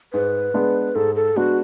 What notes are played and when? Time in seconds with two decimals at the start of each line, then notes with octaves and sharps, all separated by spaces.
0.13 G#2 B4
0.54 G#3 B3 D4
0.95 G#2 A4
1.15 A4
1.36 G#3 B3 D4 F#4